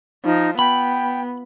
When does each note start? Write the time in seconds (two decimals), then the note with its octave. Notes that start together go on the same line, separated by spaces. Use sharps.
0.25 F3 D#4
0.59 B3 G5 B5